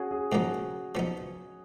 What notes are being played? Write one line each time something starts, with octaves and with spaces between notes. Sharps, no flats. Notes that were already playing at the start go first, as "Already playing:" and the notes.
Already playing: C#4 F#4 G#4
G#4
G#2 F3 A#3 D#4 F#4
F3 B3 D#4